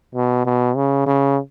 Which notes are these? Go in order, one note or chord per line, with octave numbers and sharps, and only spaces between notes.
B2
B2
C#3
C#3